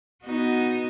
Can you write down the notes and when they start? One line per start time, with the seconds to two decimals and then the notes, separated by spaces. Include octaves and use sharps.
0.24 B3 D#4 F#4